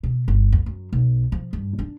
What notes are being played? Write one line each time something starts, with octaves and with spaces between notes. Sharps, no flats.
B2
G1
F2
F#2
B1
F3
G2
D4